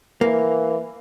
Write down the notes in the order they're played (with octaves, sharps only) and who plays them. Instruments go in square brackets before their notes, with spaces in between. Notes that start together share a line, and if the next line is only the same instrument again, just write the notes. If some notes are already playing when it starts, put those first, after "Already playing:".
[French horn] E3 [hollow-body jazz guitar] A#3